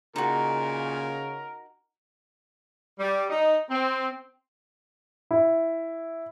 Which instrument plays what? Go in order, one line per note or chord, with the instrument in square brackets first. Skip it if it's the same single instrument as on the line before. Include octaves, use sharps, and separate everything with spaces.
[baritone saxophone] A#2 [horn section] C#3 [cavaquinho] D#4 F#4 [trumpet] A#4
[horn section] G3
D#4
C4
[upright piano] E4